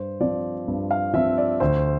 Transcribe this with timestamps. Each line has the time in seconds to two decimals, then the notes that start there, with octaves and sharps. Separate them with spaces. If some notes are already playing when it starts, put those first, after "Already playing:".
Already playing: G2 C5
0.20 F3 C4 D5
0.68 G2
0.91 F5
1.14 F3 C4 E5
1.38 D5
1.60 D2 C5